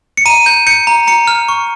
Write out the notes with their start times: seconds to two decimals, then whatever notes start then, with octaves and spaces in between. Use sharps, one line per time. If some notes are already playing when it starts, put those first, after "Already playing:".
0.17 C#7
0.26 A#5 D#7
0.46 G6
0.67 G6 C#7
0.87 A#5
1.07 A#5 C#7
1.27 F6
1.48 C#6